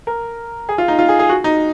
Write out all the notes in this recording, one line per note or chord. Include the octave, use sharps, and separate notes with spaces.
A#4
G#4
F4
D#4
F4
G#4
G#4
F#4
D#4